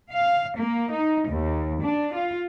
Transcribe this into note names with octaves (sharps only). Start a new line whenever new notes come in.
F5
A#3
D#4
D#2
D4
F4